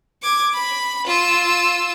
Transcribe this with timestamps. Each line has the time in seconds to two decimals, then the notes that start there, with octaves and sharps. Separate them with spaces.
0.23 D6 G#6
0.55 B5
1.08 F4 E6